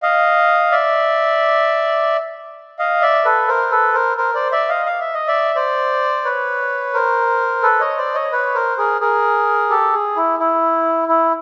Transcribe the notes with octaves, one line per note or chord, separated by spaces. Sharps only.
D#5 F5
D5 E5
D#5 F5
D5 E5
A4 B4
A#4 C5
A4 B4
A#4 C5
A#4 C5
C5 D5
D5 E5
D#5 F5
F5
E5
D#5
D5 E5
C5 D5
B4 C#5
A#4 C5
A4 B4
C#5 D#5
C5 D5
C#5 D#5
B4 C#5
A#4 C5
G#4 A#4
G#4 A#4
G4 A4
G#4
E4
E4
E4